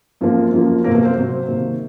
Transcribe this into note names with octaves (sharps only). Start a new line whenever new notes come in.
F#2 F3 A#3
F#2 F3 A#3
C3 F#3 A#3 C4 A#4
A#3 A#4
C4 C5
C3 F#3 C4
C3 D#3 A#3